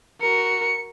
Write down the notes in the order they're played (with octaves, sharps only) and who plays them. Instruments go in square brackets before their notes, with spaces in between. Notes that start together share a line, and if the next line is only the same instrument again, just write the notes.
[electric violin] F#4 A#4 [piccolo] C#7